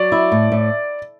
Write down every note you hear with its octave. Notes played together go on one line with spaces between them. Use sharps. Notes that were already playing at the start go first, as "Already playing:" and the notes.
Already playing: F#3 D5
E4
A2
A2